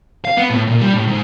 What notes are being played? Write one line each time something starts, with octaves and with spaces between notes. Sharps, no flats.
F5
B3
A2
A#2
G3
A2
G#2